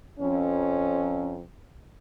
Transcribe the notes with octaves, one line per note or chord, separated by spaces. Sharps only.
F2 C#4